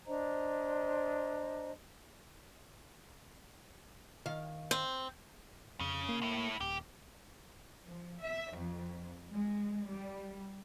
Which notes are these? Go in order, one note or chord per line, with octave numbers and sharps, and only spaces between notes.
D4 C5 D#5 A#5
D#3 F5
C4
F2 C#3
A#3
A2 E4
D#1 G4
F3
E5
F2
G#3
G3